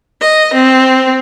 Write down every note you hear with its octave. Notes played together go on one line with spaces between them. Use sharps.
D#5
C4